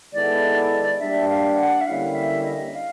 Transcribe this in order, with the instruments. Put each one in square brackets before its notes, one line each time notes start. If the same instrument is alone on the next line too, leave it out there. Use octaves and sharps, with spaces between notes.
[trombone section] D#3 G#3 B3 E4 A4 [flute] D5
[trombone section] G3 A#3 D4 [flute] E5
[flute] F5
F5
F#5
E5
[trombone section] D3 G3 A#3 C#4 E4 [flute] F5
[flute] E5
D#5
F5